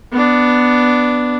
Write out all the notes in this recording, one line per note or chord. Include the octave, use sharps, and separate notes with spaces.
B3 D4